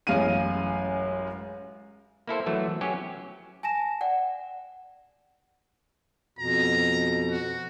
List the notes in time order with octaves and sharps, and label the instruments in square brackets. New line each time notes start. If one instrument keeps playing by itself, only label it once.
[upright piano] A1 F#2 G#3 F5 F6 D#7
[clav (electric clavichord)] A#3 E4 A4 C5
E3 F#3 A3
F#3 C#4 G4
[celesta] G#5 A5 A#6 E7
D5 F#5 G5
[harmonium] F2 B2 [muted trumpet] A#5
[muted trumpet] F#4